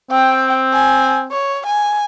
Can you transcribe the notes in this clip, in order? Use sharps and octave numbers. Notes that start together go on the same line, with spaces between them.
C4 G5
G#5
C#5
G#5